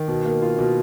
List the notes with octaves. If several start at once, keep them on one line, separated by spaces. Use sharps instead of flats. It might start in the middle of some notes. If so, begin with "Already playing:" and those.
Already playing: D#3
B2
A#3
F4
B2